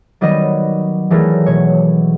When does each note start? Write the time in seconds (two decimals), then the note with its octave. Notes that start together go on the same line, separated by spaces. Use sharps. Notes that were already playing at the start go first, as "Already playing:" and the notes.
0.21 D#3 F#3 G3 B3 D#5
1.11 E3 F#3 G3 A3 G#4 A#4
1.46 B2 C#5